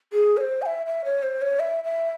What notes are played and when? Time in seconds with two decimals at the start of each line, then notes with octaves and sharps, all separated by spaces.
0.13 G#4
0.37 C#5
0.41 C5
0.62 G#5
0.66 E5
0.86 E5
1.05 C#5
1.23 C5
1.42 C#5
1.59 E5
1.84 E5